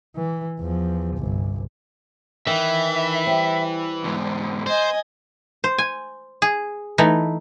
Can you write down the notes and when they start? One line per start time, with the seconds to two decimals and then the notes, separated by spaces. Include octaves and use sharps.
0.16 E3
0.60 E2 F3
1.17 G1 C2
2.47 D#3 E3 E5
3.27 G3 C4
4.04 E2 G#2
4.66 C5 D#5 G#5
5.64 C5
5.78 G#5
6.42 G#4
6.98 E3 A3 D#4